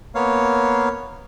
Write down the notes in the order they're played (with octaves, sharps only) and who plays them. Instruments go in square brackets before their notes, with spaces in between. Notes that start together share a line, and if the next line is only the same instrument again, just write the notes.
[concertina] A#3 B3 C#5 F5